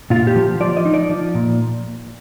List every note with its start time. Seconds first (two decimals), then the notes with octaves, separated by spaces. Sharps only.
0.10 A#2 F4
0.27 G4
0.36 F3
0.60 F3 D5
0.77 D#5
0.85 D#4
0.94 D5
1.10 F3
1.35 A#2